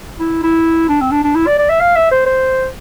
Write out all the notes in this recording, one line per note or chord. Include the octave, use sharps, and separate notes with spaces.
E4
E4
D4
C4
D4
D4
E4
D5
D5
E5
F5
E5
C5
C5